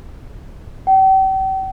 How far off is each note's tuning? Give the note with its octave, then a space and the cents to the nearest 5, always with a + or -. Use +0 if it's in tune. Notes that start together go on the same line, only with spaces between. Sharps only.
G5 -40